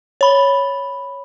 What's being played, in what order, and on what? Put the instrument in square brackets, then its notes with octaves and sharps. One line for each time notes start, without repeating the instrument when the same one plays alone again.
[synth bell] C#5 B5